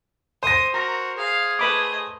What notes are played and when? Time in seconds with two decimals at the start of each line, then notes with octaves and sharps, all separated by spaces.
0.43 C5 D#6 A#6
0.74 F#4 A#4 A#5
1.18 G#4 F5
1.59 A3 B4 D#5 B5 D6